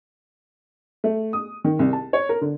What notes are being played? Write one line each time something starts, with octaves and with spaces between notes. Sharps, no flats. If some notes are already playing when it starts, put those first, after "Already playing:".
A3
D#6
D#3
C2
A5
C#5
A#4
D3